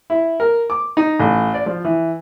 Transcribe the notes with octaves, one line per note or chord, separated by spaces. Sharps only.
E4
A#4
D6
D#4
A1
D5
F3
E3